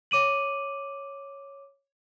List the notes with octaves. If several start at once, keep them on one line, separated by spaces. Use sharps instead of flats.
C#5 D6 D#7 F#7